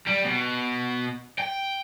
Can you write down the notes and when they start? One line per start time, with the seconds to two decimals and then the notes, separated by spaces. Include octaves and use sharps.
0.06 G3
0.24 B2
1.38 G5